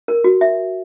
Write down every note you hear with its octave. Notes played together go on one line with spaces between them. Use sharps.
A#4
F#4
E5